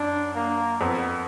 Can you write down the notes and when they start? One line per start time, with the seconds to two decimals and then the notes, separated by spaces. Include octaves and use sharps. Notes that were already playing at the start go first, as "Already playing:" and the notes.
Already playing: F#2 D4
0.35 A#3
0.81 F2 B3